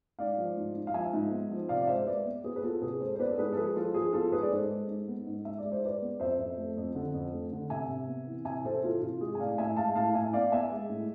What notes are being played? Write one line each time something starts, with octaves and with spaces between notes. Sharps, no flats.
G#2 D5 F5
F3
G#2
G#2
F5
F3 E5 G#5
G#2
B3
F3
C3 D5 F5
D5
G#3 C5 E5
G#3 B4 D5
B3
B3 G#4 B4
B4
B3 F4 A4
C3 G#4 B4
G#3 A4 C5
C5
B3 B4 D5
A4
G#2 G#4 B4
A4
F3 G#4 B4
F3 F4 A4
F3 G#4
B3 F4 A4
G#2 G#4 B4
D5
G#2 A4 C5
G#3
G#2
B3
G#2
G#2 E5
G#3 D5
C5
G#3 B4 D5
B3
F2 C5 E5
F2
A3
F2
D3
F2
A3
D3
C3 E5 G#5
C3
B3
E3
C3 E5 G#5
C3 A4 C5
E3 F4 A4
C3 F4
G#3 G#4
G#5
A2 D5 F5
A2 E5 G#5
G#3 F5 A5
A2 F5 A5
A2 E5 G#5
B3 D5 F5
B3 E5 G#5
G#3
A2